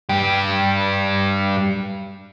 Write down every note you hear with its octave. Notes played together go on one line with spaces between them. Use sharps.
G2 G4